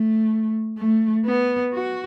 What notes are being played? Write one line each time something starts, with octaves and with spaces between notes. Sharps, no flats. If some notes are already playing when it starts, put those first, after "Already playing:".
Already playing: A3
A3
B3
F#4